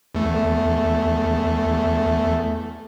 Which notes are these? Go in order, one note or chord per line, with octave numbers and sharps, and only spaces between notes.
E2 A3